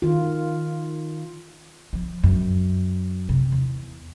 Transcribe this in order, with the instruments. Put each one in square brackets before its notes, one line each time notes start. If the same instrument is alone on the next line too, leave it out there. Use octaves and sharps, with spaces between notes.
[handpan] D#3 F4
[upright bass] F3
F#2
C3
E2